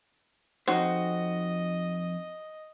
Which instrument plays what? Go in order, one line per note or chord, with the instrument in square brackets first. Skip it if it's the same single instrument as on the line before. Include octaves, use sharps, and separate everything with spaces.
[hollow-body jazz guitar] F2 D#4 C5 [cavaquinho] F#4 [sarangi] D#5